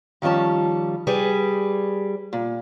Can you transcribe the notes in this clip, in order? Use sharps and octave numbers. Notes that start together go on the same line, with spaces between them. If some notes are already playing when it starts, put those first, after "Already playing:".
D#3 F3 G3 C#4 A5
G3 G#4 B4
A#2